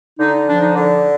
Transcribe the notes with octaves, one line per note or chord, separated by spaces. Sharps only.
D3 D#4
F3 D4
D#4
D3